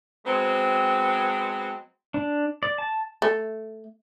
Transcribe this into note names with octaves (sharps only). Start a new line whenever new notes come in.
F#3 G#3 B3 C4
D4
D5
A5
A3